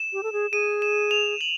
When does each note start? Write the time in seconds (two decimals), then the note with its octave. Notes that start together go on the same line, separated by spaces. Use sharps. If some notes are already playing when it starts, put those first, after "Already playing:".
Already playing: E7
0.13 G4
0.23 A4
0.33 G#4
0.52 G#4 D#7
0.82 E7
1.11 F7
1.41 F#7